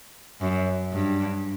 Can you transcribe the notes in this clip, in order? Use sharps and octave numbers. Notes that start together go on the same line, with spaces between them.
F#2
G2